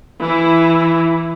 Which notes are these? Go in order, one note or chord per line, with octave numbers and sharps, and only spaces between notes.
E3 E4